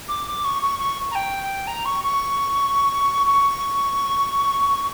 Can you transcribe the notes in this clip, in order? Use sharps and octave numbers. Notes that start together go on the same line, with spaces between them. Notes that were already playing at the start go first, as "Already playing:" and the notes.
D6
D6
C#6
C#6
C#6
A#5
G5
A#5
C#6
C#6
C#6